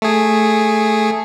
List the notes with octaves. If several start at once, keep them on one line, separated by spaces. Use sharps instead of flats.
A3 G#4